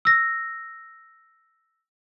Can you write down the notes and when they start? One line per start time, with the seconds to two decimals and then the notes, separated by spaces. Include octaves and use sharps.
0.05 E6 A#6